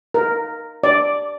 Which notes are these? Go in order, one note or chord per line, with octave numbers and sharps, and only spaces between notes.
A#4
D5